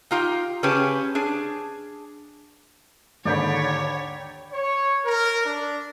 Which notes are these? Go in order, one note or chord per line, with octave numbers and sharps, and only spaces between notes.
D#4 F4 G4
C#3 C#4 G4 G#4 B4 A5
D4 G#4
D#2 G#2 D3 C#5 D5 G5 B5
C#5
A#4
D4